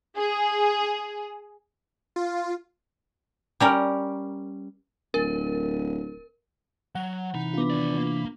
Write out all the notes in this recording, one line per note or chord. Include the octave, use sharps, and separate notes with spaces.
G#4
F4
G3 C#4 A#4
D1 A#4
F#3 F#5
C3 E3 D#4 B5
B3 D4 F4 D6
D#2 D5
A#3